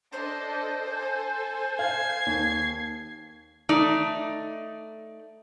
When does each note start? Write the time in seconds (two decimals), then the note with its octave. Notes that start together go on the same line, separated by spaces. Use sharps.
0.13 D4 A4 C5 D#5
0.88 A4 G#5 A5
1.79 F5 G#6 C7
2.26 D#2
3.69 A3 D#4 D5